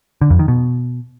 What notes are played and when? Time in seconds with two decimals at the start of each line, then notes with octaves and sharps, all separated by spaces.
0.21 D3
0.30 F2
0.39 D#3
0.48 B2